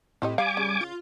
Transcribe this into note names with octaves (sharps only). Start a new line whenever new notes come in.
A2 C4 G4 D#5
G3 F5 G#5 D6
C#3
F4